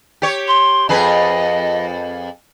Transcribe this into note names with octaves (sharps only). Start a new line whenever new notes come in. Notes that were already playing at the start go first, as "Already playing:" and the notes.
G4 C#5
C6
F2 G#4 B4 D#5